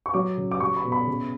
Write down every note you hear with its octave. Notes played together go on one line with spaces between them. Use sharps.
C#6
F#3 D6
C#3
D6
F#3 C#6
B5
B2
B5
C#3